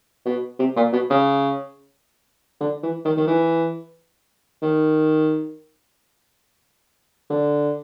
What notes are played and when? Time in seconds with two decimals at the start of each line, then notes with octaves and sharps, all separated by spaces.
0.26 B2
0.59 C3
0.76 A#2
0.93 B2
1.10 C#3
2.61 D3
2.83 E3
3.05 D#3
3.17 D#3
3.28 E3
4.62 D#3
7.30 D3